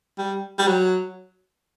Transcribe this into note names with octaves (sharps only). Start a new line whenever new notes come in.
G3
G3
F#3